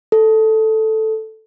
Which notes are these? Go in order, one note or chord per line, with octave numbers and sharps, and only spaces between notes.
A4